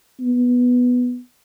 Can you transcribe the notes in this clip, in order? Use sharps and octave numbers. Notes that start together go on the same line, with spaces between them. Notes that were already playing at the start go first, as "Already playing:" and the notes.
B3